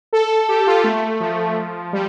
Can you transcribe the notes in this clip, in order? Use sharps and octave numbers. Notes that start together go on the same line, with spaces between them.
A4
G4
F4
A3
F3
G3